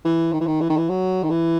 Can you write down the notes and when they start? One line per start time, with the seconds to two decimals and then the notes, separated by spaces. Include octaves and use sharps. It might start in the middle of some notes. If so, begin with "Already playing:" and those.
0.05 E3
0.33 D#3
0.41 E3
0.47 D#3
0.61 E3
0.70 D#3
0.77 E3
0.89 F#3
1.23 D#3
1.30 E3